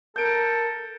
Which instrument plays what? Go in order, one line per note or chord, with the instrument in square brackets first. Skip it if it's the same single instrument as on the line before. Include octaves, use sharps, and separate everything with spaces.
[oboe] A4 [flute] A#4 [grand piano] G6 D7